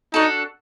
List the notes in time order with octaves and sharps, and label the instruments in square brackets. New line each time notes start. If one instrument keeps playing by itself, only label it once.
[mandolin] D4 F#4 A4 [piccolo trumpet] D#4